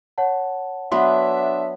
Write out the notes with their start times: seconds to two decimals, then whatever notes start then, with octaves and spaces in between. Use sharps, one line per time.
0.18 C#5 F#5 A5
0.92 F#3 B3 D4 E5 F#5 C6